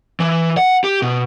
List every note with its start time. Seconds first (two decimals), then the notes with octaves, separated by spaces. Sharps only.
0.20 E3
0.57 F#5
0.84 G4
1.02 B2